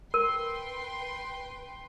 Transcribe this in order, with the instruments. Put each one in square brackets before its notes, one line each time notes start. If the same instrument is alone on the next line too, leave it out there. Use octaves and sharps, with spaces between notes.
[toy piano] A#4 [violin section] B4 G5 C6